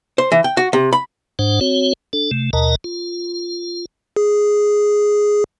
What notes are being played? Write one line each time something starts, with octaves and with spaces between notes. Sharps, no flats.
C5
E3
G5
F#4
C3
B5
G#2 D4 C5 F#5
C4 F#4 C#5
D4 A4
C3 A3
D#2 B2 A#4 D#5 A5 A#5
F4
G#4